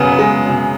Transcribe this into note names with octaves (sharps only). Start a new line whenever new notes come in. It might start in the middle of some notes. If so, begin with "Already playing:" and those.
Already playing: F#2 C#3 B3
B3
G#3
F#2 C#3